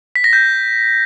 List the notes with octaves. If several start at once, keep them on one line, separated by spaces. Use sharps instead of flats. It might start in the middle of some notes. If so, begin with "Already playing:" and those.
B6
A#6
G6